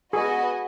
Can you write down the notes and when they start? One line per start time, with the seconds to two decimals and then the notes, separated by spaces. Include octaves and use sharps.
0.13 B3 F#4 G#4 B4 D#5 G#5